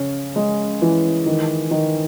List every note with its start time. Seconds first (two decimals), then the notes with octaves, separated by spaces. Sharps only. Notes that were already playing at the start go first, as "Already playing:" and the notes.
Already playing: C#3 C#4
0.36 G#3
0.82 E3
1.26 D#3
1.71 D#3